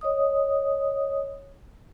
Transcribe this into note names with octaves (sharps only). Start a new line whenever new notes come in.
C#5 D#5 D#6